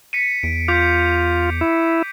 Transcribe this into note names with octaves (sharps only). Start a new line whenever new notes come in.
B6 C#7 D#7
E2 D7
F4 D6 G6 B6
E4